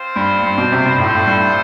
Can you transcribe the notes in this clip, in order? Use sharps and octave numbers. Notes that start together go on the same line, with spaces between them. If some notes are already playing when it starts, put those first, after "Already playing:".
Already playing: C4 F4 C5
G2
G2
B2
C3
G2
A2 F4 A4 C5
G2
A2
G2